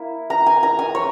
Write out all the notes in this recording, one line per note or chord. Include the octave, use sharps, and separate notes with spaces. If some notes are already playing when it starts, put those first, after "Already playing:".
Already playing: A#3 E4
A#5
G#5
A#5
G#5
C#5